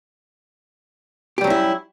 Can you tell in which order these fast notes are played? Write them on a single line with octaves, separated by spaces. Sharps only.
G4 G3 F#3 C#4 E4